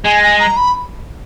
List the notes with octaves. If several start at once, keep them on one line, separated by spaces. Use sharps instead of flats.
G#3 G#5
G#5
A#5
B5